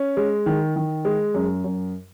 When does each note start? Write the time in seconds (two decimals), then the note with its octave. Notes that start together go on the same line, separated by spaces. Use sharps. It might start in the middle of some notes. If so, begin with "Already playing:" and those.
Already playing: C#4
0.17 G#3
0.46 D#3
0.76 D#3
1.05 G#3
1.34 F#2
1.64 F#2